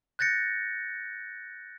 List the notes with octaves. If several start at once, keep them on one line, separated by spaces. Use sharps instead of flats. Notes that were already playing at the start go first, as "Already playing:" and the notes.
F#6 G6 A6 A#6 C#7